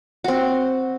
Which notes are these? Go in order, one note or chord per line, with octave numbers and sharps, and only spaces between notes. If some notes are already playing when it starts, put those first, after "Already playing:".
C4 F#4